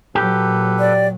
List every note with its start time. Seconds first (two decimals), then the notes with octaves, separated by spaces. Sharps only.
0.15 A#2 F#3 G4 A4 B4
0.79 D5